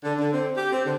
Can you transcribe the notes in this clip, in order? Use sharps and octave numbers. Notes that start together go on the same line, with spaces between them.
D3
D3
C4
G4
C4
D3